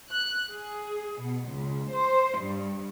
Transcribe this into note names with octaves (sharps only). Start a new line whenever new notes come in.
F#6
G#4
B2
C#2
C5
G2